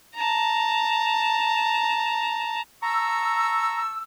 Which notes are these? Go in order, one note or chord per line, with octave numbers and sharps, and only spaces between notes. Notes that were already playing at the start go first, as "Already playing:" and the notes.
A5 A#5
A5 A#5 C#6 E6